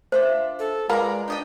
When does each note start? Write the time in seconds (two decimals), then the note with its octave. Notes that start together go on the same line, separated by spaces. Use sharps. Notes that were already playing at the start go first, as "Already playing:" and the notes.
0.12 D4 F4 C5 E5
0.59 A4
0.89 G#3 F4 A#4 B4 D5 A#5
1.28 D4 G4 D#5 G5